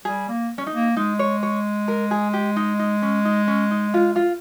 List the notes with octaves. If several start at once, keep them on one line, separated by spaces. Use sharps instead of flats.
G3 G#4
A#3
C#4
D#4
A#3
G#3 D#4
C#5
C#5
A#4
G#4
G4
D#4
D#4
C#4
D#4
C#4
D#4
F4
F4